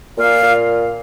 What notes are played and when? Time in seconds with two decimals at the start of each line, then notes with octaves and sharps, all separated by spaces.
0.18 A#2 F5
0.42 A#2